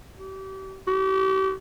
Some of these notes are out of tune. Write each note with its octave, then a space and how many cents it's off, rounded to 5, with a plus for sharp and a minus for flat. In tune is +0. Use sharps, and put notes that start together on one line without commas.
G4 -35
G4 -40